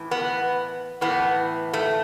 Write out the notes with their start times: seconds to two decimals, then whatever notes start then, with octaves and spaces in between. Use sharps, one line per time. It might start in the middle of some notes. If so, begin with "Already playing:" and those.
Already playing: A2 E3
0.11 B3
1.01 A2 E3 B3
1.73 A3